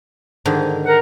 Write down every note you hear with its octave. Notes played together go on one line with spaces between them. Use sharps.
G#2 D3 D#3
A#4 F#5